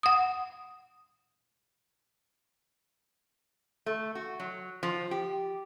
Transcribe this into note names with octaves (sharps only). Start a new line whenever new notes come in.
F#5 D#6
A3
F#4
F#3
F3
G4